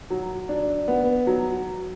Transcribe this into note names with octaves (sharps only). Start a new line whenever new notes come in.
F#3
D4
B3
F#3